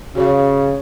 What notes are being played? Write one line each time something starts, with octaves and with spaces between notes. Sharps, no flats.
C#3 F#4 C#5 F5